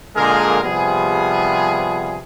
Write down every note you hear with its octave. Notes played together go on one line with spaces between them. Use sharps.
A#2 D3 G#3 G#4 A#4 F5
C3 F3 G3 B3 G#4